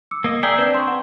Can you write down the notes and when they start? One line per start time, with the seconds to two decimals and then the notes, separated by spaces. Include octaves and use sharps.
0.11 D6 E6 C#7
0.24 A#3 D#5
0.43 G#4 D5 E5 G5 G#5 A#5
0.58 C4 D4 B4 D5 G6
0.74 C6 C#6
0.88 F#5